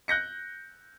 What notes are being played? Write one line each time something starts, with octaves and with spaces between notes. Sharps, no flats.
F#6 G6 A#6 C#7